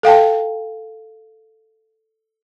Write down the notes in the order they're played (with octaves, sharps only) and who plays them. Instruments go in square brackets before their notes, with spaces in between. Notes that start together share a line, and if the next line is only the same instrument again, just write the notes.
[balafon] A4 F5 G5 A5